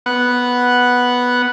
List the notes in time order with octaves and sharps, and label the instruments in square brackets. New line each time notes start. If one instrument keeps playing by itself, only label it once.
[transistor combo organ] B3 F#5